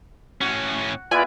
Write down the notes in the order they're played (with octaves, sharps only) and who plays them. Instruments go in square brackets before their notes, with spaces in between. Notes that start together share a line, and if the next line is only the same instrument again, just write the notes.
[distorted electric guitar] A2 C#4 [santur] F#4 F#5
[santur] G#3 B3 E4 [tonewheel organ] F4 B4 D5 [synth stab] G#5